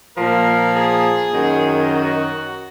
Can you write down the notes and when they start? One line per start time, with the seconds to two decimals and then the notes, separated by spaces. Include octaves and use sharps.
0.15 A#2 F3 A#4
0.74 G#4
1.33 F#2 D#3 F#3
1.93 F#4